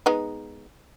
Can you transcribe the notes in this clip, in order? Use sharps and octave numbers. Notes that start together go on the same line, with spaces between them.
G#3 B3 D#4